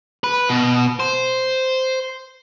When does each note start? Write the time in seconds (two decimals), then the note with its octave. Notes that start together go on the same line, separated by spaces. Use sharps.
0.24 B4
0.49 B2
1.00 C5